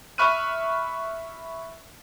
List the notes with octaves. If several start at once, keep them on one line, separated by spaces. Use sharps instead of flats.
E5 B5 C#6 F6 F#6 D#7